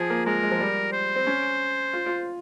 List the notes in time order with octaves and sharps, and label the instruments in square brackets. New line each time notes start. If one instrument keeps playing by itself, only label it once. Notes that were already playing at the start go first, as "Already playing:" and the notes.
Already playing: [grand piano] F3 [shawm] G#4
[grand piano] A#3
[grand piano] G#3 [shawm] A#4
[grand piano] G#3
F3
G3
[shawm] C5
[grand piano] C4
C#4
F4
F4